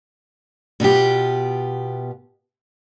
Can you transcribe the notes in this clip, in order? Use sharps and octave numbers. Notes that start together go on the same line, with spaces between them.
B2 B3 F4 G4